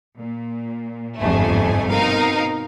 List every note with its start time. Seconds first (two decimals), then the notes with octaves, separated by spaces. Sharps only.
0.16 A#2
1.20 G1 C2 F2 G#2 A3 G#5
1.90 B2 C4 D#4 A#4 F5